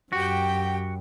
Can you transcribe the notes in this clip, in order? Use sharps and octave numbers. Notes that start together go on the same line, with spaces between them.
F#2 F#4 G4 G5